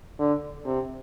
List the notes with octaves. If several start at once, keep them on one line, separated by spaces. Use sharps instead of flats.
D3
C3